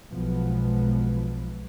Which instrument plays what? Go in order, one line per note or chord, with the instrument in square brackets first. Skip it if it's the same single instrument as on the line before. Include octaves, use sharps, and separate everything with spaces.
[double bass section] B1 F3 G#3 B3